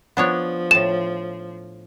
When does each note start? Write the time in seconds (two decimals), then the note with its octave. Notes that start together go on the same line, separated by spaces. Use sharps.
0.17 F3 B3 D4 C#5
0.71 A2 A5 E7